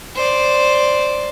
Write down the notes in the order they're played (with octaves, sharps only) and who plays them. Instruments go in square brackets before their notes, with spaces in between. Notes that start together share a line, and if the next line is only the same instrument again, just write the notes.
[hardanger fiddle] C5 D5